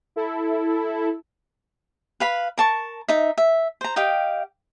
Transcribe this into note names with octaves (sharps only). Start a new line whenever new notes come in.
E4 A4
B4 F5 B5
A#4 A5 C#6
D#4 E5
E5
C5 A#5
G4 D#5 F5 G5